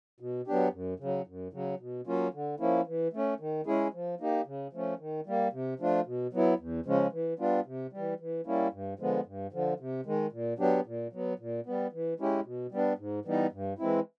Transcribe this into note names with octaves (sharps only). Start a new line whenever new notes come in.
B2
F#3 B3 D4 G4
F#2
C#3 F#3
F#2
C#3 F#3
B2
F#3 A#3 C#4 F4
D3
F3 A#3 C#4 E4
E3
A3 C#4
D#3
G#3 C#4 E4 G#4
F3
A#3 D#4 G4
C#3
F3 A3 C#4
D#3
G3 A#3
C3
F3 A3 D4 F4
B2
F#3 B3 E4
E2
C#3 F3 G#3 C#4
E3
G3 B3 D4 F4
C3
E3 G3
E3
G3 A#3 C#4 E4
G2
D3 F3 G#3 B3
G2
D3 F3
C3
D#3 G#3
A#2
F#3 B3 D4 G4
A#2
F#3 B3
A#2
G3 B3
E3
G#3 C#4 E4 G4
B2
G3 B3 D4
G#2
E3 G3 B3 D#4
G2
E3 G#3 C4 E4